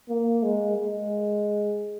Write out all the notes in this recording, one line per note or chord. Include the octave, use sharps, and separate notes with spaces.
A#3
G#3
G#3